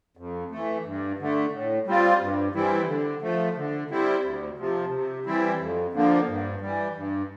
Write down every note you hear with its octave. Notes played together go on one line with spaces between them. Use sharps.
F2
E3 A3
G2
D3 A3
A2
G3 C4 F4
G2
E3 G3 C4 E4
D3
F3 A3
D3
G3 C4 E4
D2
C3 F3
C3
E3 G3 C4 E4
F2
D3 F3 A#3
G2
E3 G3
G2